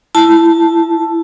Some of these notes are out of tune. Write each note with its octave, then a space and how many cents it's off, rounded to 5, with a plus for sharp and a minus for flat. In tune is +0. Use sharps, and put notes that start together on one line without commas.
E4 +15 A5 +0